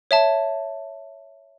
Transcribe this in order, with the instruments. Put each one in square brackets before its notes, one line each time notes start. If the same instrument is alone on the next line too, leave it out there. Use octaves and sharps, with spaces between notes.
[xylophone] C#5 E5 A5